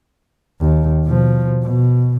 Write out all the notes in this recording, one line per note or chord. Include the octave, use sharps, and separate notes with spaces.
D#2
B2 F3
B2